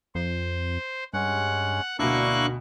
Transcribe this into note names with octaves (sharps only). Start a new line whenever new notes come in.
F2 C5
G2 G#3 C#4 F#5
D2 B2 A#3 D4 E4 C#6 E6 F#6